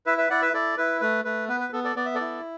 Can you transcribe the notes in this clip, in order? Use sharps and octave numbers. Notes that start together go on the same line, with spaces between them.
E4 B4 E5
B4 E5
E4 D5 F#5
B4 E5
E4 A4 D5
E4 B4
A3 B4
A3 B4
B3 B4
B4
B3 A4
A4 D5
B3 D5
E5
A4 D5
E4